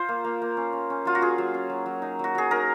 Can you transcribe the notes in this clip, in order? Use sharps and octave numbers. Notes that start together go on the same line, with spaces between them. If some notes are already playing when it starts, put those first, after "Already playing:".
Already playing: F4 C5
A#3
A#3
A#3
C#4
C#4
C#4
F#3 F4
F#4
F4 G#4
F#3
C#4
F#3
F#3
D#4
F#3 F#4
F#3 G#4
D#4 A#4